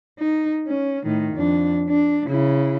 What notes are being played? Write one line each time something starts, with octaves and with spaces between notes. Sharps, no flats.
D#4
C#4
A2 D#3
F2 D4
D4
C#3 E4